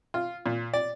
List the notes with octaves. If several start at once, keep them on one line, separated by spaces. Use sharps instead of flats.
F4
A#2
D5